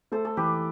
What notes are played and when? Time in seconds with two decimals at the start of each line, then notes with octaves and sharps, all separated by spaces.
0.12 A3 A4 C5
0.25 A4
0.37 E3 G4 B4